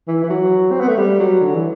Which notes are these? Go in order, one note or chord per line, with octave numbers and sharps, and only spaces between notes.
E3
E3
F#3
C4
B3
A3
G3
F#3
D3
E3